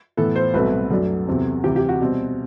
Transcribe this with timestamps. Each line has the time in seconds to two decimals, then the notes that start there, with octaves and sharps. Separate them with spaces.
0.17 A2 E3 B3 A4
0.36 C5
0.54 C2 B2 F#3 A3 C4 B4
0.91 F#2 F#3 A3 D4 A4
1.27 E2 C3 F#3 C4
1.64 D2 C3 E3 G4
1.76 G4
1.89 F#4
2.01 B2 G3 C4